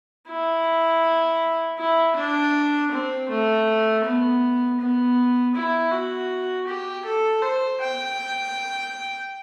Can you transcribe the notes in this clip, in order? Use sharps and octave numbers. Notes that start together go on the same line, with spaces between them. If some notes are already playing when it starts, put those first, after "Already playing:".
E4
E4
D4
C4
A3
B3
B3
E4
F#4
G4
A4
C5
G5